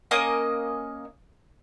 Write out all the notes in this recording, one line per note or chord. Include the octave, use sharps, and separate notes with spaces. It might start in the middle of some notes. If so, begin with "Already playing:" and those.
A#3 C#4 D#5 D#6